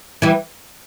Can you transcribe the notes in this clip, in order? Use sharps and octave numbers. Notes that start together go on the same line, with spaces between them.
E3 G3